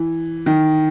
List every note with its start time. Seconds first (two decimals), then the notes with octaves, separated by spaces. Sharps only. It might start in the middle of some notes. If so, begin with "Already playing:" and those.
Already playing: E3
0.46 D#3